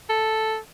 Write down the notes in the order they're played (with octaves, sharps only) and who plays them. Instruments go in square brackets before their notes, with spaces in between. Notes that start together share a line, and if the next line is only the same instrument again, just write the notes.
[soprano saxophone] A4